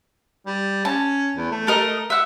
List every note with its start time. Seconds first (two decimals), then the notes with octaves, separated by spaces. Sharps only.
0.46 G3
0.85 C#4 A5
1.36 E2
1.52 A3
1.67 A4 A#4 D#5
2.10 E5 F#5